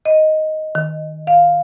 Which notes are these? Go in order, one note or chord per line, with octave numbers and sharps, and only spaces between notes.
D#5
D#3
F5